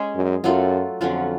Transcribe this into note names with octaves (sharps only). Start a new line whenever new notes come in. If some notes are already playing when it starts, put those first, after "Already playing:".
Already playing: G#3 C#4 G#4
F#2
F#2 F#3 A3 F4
F2 D3 F#3 C#4 F4